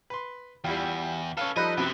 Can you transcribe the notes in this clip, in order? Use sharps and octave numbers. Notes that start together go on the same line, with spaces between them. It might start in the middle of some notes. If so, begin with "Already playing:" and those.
B4 C6
E2 G3 E4 F4 G5
C#4 A4 B4 F5
F3 G3 D#4 A4 D#5 B5 F#6
F#2 C3 B3 C4